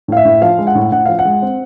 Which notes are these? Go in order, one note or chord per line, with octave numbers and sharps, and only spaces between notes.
A2 F5
E5
A2
F3 F5
G#3
F#5
A2
A2 F#5
F3 F5
F#5
G#3
C4